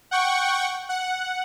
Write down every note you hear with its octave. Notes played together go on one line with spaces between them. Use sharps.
F#5 G5 C#6
F#5